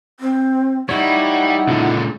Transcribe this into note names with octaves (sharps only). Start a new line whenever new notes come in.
C4
G3 D#4 E4 C#5 F#5
C#2 A#2 D3